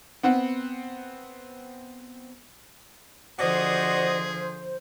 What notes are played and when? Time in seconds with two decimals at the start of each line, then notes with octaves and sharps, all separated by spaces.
0.23 B3 C4 F#5
3.40 D3 F3 F#4 G#4 C5 D5 D#5